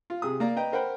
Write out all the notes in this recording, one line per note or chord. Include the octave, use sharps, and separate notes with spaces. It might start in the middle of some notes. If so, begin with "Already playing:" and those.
F4
C3 G#4 D#6
A#3 D5 A#5
B4 D#5 G5 A#5
A#4 C5 F#5 G5 B5